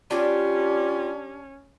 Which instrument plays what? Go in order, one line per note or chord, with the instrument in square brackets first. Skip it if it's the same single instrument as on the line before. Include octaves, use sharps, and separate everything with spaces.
[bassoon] G3 [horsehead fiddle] C#4 [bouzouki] D4 G4 [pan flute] F4